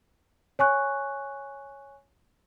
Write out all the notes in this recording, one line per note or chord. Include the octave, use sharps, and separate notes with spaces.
C#5 G#5 C#6 F#6